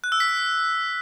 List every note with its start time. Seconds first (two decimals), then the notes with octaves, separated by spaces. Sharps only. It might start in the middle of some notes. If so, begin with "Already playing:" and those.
0.04 F#6
0.12 E6
0.20 B6